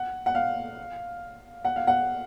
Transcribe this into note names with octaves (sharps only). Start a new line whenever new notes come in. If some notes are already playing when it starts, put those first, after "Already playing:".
Already playing: F#5
F#5
F5
F#5
F5
F#5